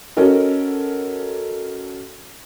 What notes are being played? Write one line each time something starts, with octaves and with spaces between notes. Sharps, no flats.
C#4 F#4 A4 A#4 D#5